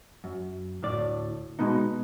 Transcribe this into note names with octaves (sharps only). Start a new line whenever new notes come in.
F#2
D2 A2 D5
B2 G#3 B3 D#4